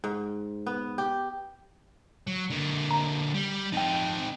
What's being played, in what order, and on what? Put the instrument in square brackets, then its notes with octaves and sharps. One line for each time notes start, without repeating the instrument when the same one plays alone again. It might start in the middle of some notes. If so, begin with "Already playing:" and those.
[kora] G#2
B3
G4
[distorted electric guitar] F#3
D3 A#3
[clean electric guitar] A#5
[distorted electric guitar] G3
[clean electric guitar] F2 G5 [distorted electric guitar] C4 D#4